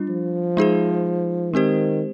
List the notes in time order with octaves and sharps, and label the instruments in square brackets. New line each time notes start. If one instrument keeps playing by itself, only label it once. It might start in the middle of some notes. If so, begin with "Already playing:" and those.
Already playing: [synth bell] G3 D4 F4
[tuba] F3
[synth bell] G#3 D#4 G#4 C5
[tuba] D#3 [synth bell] G#3 C4 G4 C5